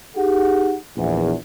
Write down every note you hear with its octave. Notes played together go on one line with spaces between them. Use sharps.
D#4 G4 G#4 F#5
A#1 E2